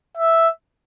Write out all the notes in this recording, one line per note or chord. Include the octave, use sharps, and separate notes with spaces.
E5